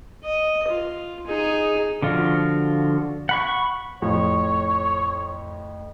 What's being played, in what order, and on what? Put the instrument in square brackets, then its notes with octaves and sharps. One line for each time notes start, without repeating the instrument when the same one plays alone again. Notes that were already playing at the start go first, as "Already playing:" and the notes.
[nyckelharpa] D#5
F4
D#4 G#4
[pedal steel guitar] D3 F3 F4 F#4
F#5 B5 C#6
[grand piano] F2 A2 F3 [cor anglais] C#5